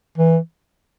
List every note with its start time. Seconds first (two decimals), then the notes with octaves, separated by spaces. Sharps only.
0.18 E3